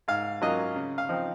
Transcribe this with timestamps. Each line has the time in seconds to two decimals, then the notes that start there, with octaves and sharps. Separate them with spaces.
0.08 G#2 F5
0.42 F#3 A#3 C#4 F4 D#5
0.76 C#3
0.98 F5
1.09 F3 C4 D#4